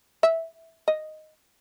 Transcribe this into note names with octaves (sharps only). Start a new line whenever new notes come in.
E5
D#5